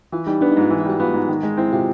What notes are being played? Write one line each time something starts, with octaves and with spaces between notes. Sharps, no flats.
E3 F4
G3 D#4
B3 D4
D#4
G#2 F4
E3 D#4
E4
G3 F#4
B3 F4
G#2
D#3
G#3
C4 E4
C3 F4